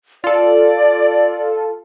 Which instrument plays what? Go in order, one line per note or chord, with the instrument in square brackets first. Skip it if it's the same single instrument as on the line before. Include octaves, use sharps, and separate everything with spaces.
[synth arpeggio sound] F4 A4 [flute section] D5